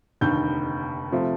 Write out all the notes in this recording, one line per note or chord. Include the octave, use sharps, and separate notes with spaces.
F1 D#2 D3 G6
C3 F3 A3